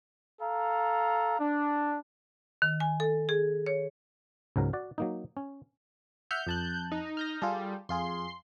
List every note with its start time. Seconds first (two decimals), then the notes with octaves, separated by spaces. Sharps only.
0.41 A4 F5 A#5
1.39 D4
2.62 D#3
2.80 G#5
3.00 A4
3.29 G#4
3.66 C#5
4.56 C#2 G#2 F#3 A#4
4.73 F#4 D5
4.98 F#3 A#3 D#4
5.37 C#4
6.31 E5 F#5 F6 G6
6.47 F2 A5 F#6
6.92 D#4
7.17 F6 G6 A#6
7.42 G3 F4 G#4 A4
7.89 F2 F4 G#4 C6